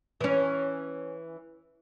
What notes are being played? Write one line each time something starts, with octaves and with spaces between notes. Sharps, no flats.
E3 C#4